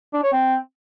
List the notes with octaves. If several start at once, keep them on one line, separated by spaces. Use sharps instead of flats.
D4
C#5
C4